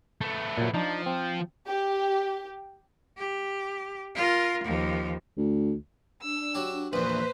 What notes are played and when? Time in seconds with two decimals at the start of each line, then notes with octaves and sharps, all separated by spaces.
0.21 A3 B3
0.58 A#2 F#3
0.74 F3 D4 D#4
1.06 C4
1.67 G4
3.18 G4
4.15 F4 A#4
4.64 D#2 F3
5.37 D2
6.22 D4 E6
6.55 F#3 G4
6.93 A#1 E2 B4 C5 E5 A#5